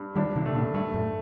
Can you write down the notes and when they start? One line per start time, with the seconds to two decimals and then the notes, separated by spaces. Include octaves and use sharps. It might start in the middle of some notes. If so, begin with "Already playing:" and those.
Already playing: G2
0.16 D#3 G3 D4
0.36 C3 D#3
0.46 C3 A3
0.55 A#2 D3
0.74 G2 A3
0.94 F#2 A2